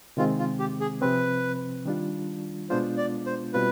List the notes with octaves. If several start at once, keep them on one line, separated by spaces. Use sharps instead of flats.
C3 D#3 G#3 C4 F4
F4
G4
G#4
C3 F3 C4 B4
D#3 G3 D4 F4
B2 G#3 B3 D4 F4 C5
D5
C5
B2 G3 C4 F4 B4